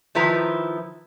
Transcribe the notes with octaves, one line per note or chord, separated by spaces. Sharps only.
D#3 F3 E4 B4 A#5